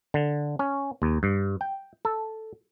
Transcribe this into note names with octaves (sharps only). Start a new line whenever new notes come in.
D3
C#4
D#2
G2
G5
A4